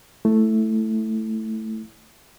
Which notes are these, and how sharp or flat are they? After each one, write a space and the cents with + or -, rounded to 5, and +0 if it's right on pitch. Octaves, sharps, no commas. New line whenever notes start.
A3 +0 E4 +0